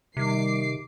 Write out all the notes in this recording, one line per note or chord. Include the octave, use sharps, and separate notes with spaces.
C3 D#3 G3 D6 C7